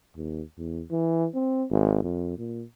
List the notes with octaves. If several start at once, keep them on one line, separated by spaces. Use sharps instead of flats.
D#2
E2
E3
C4
G#1
F2
A#2